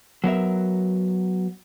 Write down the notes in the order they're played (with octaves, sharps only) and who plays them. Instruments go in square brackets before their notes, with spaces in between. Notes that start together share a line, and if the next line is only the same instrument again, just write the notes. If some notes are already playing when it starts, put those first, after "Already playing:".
[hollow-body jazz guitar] F#3 B3 A#4 E5